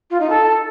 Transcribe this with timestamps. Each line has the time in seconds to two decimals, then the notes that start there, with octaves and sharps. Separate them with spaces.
0.10 F4
0.20 D#4
0.29 A4